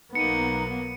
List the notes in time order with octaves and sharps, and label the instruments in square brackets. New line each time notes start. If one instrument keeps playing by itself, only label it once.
[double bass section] B1 B3 [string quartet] F#3 A#3 [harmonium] D#4 [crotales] C#7 D#7